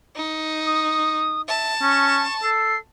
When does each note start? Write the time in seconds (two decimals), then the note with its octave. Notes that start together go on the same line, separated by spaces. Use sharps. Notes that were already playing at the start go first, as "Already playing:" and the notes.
0.16 D#4
0.66 D#6
1.48 E5 A5
1.82 C#4 C#6
2.43 A4 C7